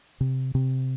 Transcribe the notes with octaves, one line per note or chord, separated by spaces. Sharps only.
C3
C3